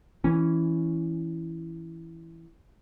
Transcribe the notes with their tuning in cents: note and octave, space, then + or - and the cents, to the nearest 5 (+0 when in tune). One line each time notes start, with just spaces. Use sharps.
E3 +0 C#4 +0